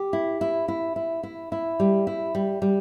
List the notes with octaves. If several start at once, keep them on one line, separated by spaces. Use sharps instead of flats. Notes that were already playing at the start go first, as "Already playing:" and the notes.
Already playing: G4
E4
E4
E4
E4
E4
E4
G3
E4
G3
G3